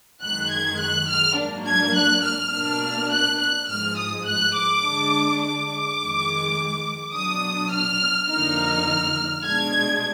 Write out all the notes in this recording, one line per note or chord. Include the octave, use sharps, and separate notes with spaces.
F#2 D#3 G#3 F#6
G#6
F#6
F6
G#2 F#3 A#3 D4
G#6
F#6
F6
B2 A#3 D4
F#6
F#6
G#2 F3 G#3 F6
D#6
F#6
D6
D3 G#3 D4
D6
F2 D#3 G#3
B2 F#3 D4 D#6
F6
F2 D3 F3 A#3 D#4 F6
B2 G#3 D4 G#6